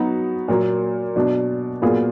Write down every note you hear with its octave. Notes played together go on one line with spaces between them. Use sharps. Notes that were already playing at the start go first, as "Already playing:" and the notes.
Already playing: F#3 B3 D#4 F#4
A#2 F#3 A#3
B2 F#3 D4
A#2 F#3 B3 F4 G#4